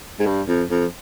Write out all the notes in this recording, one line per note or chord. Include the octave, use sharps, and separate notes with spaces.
G#2
G2
F2
F2